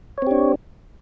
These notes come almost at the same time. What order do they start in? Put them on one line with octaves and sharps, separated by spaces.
C#5 C4 G4 D4